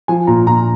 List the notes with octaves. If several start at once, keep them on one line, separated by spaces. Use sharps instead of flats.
F3 G#5
A#2 A#5
A#2 A#5